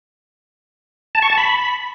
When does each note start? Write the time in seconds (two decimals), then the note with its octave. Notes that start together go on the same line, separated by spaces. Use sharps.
1.15 A5
1.22 C#6
1.30 A5
1.37 B5